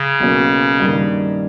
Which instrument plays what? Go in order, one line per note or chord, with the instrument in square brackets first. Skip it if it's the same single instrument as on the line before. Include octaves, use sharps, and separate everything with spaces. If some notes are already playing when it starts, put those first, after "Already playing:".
Already playing: [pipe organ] C#3
[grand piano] B1 B2 A#3 C#4
G2 D#3 A#3